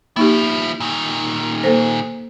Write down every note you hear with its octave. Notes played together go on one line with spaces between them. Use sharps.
F3 A#3 D#4 E4 G4
A#2 D#3
A#3 A4 C5